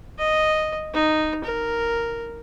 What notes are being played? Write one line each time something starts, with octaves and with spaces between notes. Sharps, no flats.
D#5
D#4
A#4